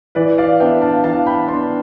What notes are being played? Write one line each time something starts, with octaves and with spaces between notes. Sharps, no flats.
E3 B4 D5
D5 F5
B3 D4 E5 G5
F5 A5
E3 F5 A5
G5 B5
B3 A5 C6
D4